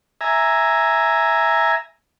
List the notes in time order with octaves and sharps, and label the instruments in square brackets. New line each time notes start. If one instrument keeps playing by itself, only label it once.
[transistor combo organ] E5 G#5 A#5